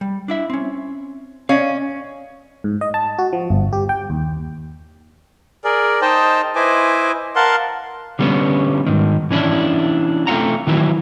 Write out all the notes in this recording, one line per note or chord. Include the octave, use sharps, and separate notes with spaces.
G3
D4 E4 E5
C4 C#4
C#4 D5 D#5 F5
G#2
D#5
A5
F#4
F3
G1
G4
G5
D#2
G#4 A#4 D5
D#4 C5 D#5 G5 A5
E4 B4 C5 D#5 G#5 D6
A#4 F5 F#5 A5 C6
D3 G3 A3 B3 C#4
G#2 D#3
E3 C#4 D4 E4
A3 C4 F4 F#5 A#5
D#3 E3 F#3 E4